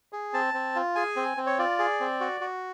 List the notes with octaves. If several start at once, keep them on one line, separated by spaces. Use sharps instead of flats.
G#4
C4 A5
C4
F4
G#4 G#5
C4
C4
C#5
F4 D5
G#4
C4
F#4
F#4